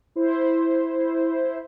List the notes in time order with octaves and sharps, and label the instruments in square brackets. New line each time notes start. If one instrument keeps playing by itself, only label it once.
[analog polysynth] E4 C5